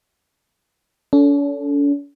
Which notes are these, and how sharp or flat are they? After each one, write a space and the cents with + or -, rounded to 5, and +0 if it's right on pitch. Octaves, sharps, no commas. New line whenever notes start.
C#4 +45 A4 +0